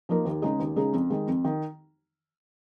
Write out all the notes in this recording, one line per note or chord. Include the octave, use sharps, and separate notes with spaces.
F3 A#3 D#4 A#4
D#2
C#3 G#3 D#4 G#4
D#2
C#3 G#3 D#4 G#4
F2
D#3 G#3
F2
D#3